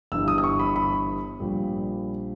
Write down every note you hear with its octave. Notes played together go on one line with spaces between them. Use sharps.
G1 G2 E3 G3 E6
D#6
D#6
C#6
B5
B5
A#1 A#2 G3